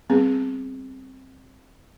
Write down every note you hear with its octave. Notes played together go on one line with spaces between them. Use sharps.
G3 B3 C4 G#4